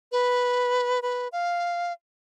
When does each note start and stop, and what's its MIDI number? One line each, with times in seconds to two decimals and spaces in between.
0.12 1.00 71
1.02 1.28 71
1.32 1.93 77